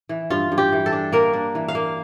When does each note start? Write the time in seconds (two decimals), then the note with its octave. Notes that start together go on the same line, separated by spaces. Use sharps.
0.09 E3
0.30 G2 F4
0.52 G2
0.58 G4
0.72 E3
0.86 A4
0.92 D4
1.12 A#3 A#4
1.33 D4
1.55 E3
1.68 F5
1.75 A#3